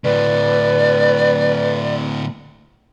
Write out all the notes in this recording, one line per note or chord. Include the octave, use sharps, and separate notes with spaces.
D2 A2 B4 D5